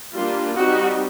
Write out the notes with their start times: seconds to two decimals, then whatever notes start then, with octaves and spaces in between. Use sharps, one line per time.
0.14 G3 A#3 D4 F4
0.56 G3 C4 D#4 F#4